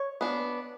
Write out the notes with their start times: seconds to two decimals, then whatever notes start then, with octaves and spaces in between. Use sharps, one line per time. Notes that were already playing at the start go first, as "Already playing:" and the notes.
Already playing: C#5
0.21 B3 D4